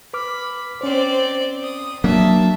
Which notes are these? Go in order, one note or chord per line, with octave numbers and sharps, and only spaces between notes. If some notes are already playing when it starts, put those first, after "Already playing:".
B4 B5 D6 F6
C4 C#4 C5 D5
D#6
F#3 A#3 D4 E5 A5